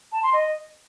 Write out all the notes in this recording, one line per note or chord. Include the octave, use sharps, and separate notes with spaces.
A5
C6
D#5